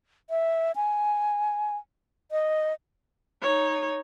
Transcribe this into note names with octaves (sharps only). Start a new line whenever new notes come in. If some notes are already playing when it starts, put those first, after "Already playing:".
E5
G#5
D#5
D#4 C#5